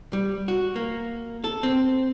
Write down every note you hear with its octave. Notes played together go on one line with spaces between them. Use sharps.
G3
F#4
A#3
A4
C4